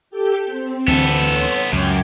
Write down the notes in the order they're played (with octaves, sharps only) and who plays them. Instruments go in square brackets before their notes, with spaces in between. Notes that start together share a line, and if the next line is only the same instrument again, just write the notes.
[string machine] G4 A4 G5
C4
[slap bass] D2 D3 E3 [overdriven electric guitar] B3 A4
[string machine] C#5 C6
[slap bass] C#2 [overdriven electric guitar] F#2 [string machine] G5 D6 G#6